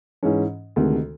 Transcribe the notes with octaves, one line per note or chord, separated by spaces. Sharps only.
G#2 E3 G#3 C#4
D2 C3 D#3 G#3